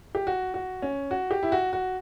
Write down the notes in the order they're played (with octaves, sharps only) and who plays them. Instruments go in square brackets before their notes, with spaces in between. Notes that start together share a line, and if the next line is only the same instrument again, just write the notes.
[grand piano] G4
F#4
F#4
C#4
F#4
G4
E4
F#4
F#4